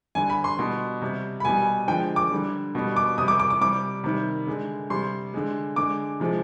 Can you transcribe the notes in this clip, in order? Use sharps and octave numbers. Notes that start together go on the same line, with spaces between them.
D3 G3 G#5
B5
C6
B2 G3
C3 G3
B5
B2 G3 G#5
D3 F3 G#3 G5
D6
D3 G3
B2 G3
D6
C3 G3 D#6
D6
D6
D6
C3 G3 D6
C3 D#3 G3
D3 G#3
C3 G3 C6
D3 G#3
D3 G#3 D6
C3 F3 G#3